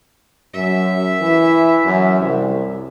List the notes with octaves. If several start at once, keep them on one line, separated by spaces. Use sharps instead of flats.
F#2 E5
E3
F#2
C2